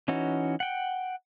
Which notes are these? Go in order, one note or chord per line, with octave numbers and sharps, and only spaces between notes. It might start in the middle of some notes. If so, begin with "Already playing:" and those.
E3 C#4 D#4 F#4
F#5 G5